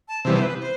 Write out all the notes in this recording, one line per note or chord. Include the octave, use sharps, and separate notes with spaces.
A5
C3 E3 G3 B3 C5
C5
B4
C5